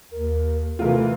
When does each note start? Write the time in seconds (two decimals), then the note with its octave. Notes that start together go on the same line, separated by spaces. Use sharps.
0.11 D#2 A#4
0.79 C3 E3 A3 F4 A4 A#4